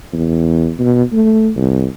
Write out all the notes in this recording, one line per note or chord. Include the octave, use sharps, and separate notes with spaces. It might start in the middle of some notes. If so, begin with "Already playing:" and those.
E2
B2
A3
C2